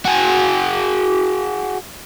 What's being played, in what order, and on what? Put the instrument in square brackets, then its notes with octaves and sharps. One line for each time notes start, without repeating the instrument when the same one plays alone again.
[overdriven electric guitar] F#4 G#4